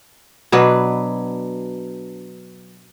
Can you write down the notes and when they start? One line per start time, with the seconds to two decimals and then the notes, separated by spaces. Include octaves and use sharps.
0.52 B2 F#3 D4 B4